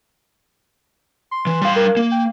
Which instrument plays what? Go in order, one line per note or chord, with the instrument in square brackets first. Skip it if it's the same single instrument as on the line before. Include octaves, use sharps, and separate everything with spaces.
[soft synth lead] C6
[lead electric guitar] E3
G3 F5
[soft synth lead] A#4
[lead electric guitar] A#3
[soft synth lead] G5